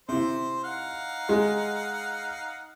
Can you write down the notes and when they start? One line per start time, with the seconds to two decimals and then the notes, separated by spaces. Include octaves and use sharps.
0.09 C3 E4 C5
0.64 D#4 F5 F#5
1.29 G#3